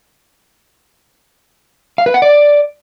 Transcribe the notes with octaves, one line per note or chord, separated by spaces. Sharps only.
F5
B4
F#5
D5